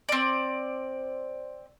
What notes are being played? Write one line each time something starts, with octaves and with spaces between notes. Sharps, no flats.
C4 D5